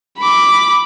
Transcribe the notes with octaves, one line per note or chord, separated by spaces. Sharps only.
B5 D6